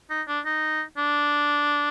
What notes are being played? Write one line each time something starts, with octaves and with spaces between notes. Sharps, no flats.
D#4
D4
D#4
D4